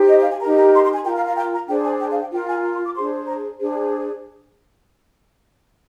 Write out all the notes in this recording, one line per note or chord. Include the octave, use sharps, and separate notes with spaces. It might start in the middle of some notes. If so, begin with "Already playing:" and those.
Already playing: D#4 G4 C5
D#5
F5
G#5
D#4 G4 A#4 A#5
A#5
C6
C6
G#5
F4 A#4 G5
F5
F5
G5
A#5
D4 G#4 C5 G5
G#5
G5
F5
G5
F4 A#4 G5
G#5
A#5
C6
D6
D4 G#4 C5 C6
A#5
D4 G#4 C5